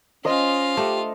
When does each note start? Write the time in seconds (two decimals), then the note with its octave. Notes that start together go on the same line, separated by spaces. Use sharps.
0.25 C#4 F4 C5 D#5 F5
0.77 A3 D4 G4